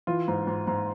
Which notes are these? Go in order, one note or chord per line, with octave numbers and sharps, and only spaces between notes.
E3 F4
G#2
G#2
G#2